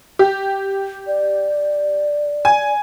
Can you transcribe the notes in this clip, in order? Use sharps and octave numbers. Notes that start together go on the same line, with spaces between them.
G4
D5
G#5